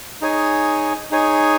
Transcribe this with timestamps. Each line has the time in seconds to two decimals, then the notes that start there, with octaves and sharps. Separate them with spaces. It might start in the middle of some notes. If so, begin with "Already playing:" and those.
0.21 D#4 G#4 C#5 G#5
1.11 D#4 G#4 C#5 G#5